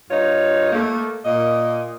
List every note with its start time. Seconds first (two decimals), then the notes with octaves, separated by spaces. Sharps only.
0.10 G2 D#4 F4 C#5
0.72 A3 A#3
1.25 A#2 D#5